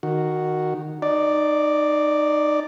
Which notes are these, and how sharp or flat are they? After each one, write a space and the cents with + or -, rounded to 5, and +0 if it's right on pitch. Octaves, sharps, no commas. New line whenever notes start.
D#3 -10 F#4 +0
D#4 -20 D5 +0